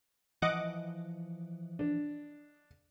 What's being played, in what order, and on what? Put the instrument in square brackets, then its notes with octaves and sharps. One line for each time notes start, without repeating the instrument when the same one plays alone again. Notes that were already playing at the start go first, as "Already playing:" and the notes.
[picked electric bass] E3 F3 [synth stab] D#5 F#5 D6
[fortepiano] D4